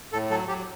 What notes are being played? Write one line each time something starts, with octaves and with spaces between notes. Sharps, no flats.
A2 A4
F#3 A4
F#3 G4